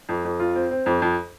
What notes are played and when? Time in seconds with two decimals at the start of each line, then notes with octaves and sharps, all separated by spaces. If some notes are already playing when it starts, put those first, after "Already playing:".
0.09 F2
0.25 F2
0.40 F4
0.55 C4
0.71 C4
0.86 F2
1.02 F2